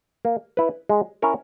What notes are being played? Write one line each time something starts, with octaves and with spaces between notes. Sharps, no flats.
A#3
E4 B4
G#3
C#4 E4 A#4 C#5